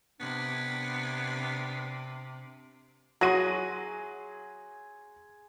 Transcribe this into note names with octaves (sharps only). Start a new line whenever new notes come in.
C3 B3 D4
F#3 E4 F#4 G#4 C6 A#6 D#7